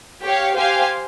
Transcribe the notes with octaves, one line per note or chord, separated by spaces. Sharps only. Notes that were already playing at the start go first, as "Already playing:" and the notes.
G4 C#5 F5
G4 C5 F5 G#5